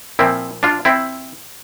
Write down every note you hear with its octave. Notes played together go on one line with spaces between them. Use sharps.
A#2 F3 C4 E4
D4 F4
C4 E4